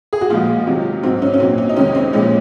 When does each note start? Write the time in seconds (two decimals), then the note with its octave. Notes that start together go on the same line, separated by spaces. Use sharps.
0.13 G#4
0.21 F#4
0.30 A#2 F3 G#3 F4
0.67 C3 D#3 F#3
1.03 G#2 F#3 C4
1.22 C#4
1.34 C#4
1.40 A#2 F#3 C4
1.58 C#4
1.69 D#4
1.77 F2 C3 D#3 G#3 C#4
1.95 C4
2.13 A#2 F3 G#3 C#4